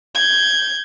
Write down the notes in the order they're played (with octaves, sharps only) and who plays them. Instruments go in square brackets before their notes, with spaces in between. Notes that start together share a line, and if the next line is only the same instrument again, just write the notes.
[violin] G6 G#6